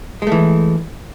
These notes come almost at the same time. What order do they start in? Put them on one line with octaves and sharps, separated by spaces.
G#3 A3 E3